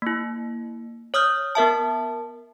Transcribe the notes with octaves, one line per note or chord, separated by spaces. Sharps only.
A#3 E4
C#5 D#6 F6 G6
B3 A#4 E5 A5